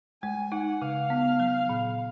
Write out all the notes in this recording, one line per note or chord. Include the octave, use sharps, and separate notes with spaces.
G#3 G#5
D#4 F#5
C#3 F5
B3
F#3
A#2